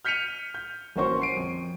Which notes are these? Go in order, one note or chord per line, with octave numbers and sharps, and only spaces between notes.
F6 G6 B6 C#7 D#7 F7
G6
A1 A#3 C#4 F#4 C5 C#6
C7 D7 D#7
F2